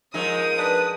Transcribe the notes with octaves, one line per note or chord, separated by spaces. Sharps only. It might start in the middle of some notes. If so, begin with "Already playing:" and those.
F3 G#3 D#4 A#4 D#6
D4 B4